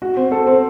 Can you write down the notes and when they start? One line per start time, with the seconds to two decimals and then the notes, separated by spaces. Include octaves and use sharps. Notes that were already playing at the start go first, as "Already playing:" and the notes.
0.02 F#4
0.17 C4
0.32 A4
0.47 C4